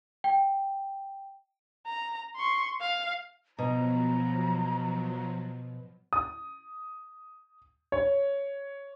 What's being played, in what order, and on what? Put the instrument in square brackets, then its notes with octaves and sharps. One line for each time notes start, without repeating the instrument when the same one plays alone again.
[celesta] G5
[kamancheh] A#5
C6 C#6
F5
[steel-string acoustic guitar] B2 [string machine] F3 F#3 [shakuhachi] A#5
[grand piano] D#6
C#5